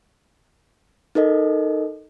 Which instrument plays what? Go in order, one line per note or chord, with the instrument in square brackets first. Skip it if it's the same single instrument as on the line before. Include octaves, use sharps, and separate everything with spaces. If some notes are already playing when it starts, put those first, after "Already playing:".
[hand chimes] D#4 A4 A#4 D#5